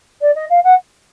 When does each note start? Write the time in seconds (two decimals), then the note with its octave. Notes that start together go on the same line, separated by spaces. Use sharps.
0.21 D5
0.36 D#5
0.50 F5
0.64 F#5